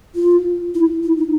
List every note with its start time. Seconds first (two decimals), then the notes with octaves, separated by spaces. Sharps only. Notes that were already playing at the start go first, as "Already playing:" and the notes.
0.15 F4
0.74 E4
1.03 E4
1.17 D#4